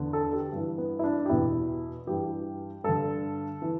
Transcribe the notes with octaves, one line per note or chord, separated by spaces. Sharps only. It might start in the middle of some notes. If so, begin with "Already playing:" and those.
Already playing: E2 D3
A4
G4
G2 E3
B3
E4
D4
G4
E2 B2 E4
G2 E3 G4
G2 D3 A4
E3